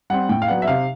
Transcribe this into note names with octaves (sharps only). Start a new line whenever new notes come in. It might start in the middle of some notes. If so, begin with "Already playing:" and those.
G3 C4 F#5
A2 G5
F5
F#3 B3 D4 F#5
E5
C3 F5